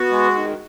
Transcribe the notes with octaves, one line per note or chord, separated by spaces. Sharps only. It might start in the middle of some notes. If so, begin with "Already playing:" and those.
Already playing: B3 F#4
G#3
D#3